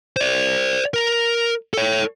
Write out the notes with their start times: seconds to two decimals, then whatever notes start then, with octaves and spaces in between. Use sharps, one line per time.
0.16 C5 D5
0.94 A#4 A#5
1.74 A4 C#5